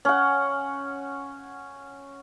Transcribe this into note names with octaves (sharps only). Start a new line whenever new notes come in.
C#4 F#5